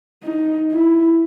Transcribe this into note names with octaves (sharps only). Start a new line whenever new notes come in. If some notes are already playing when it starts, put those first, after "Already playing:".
D#4
E4